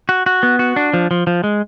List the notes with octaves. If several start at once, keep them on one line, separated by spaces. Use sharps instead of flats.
F#4
F#4
B3
F#4
D4
F3
F3
F3
G#3